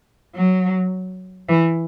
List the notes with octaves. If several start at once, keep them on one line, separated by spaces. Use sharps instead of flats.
F#3
E3